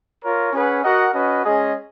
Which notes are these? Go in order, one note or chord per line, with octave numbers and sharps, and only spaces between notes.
F4 A#4 C#5
C#4 G#4 B4 F#5
F#4 A#4 D#5 F#5
C#4 F#4 B4 D#5
G#3 C#4 G#4 D#5